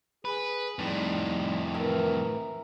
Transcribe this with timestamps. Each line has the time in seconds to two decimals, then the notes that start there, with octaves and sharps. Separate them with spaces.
0.25 G#4 B4
0.79 F2 A2 G3 D#4
1.74 E3 A#4 E5 A#5